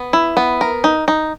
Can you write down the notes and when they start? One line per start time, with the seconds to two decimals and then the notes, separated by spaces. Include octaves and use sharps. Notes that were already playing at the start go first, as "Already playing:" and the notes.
Already playing: B3
0.13 E4
0.37 B3
0.61 A#4
0.84 D#4
1.08 D#4